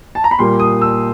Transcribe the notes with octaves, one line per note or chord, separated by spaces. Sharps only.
A5
A#5
B5
A#2 G3 A#3 C6
D#6
E6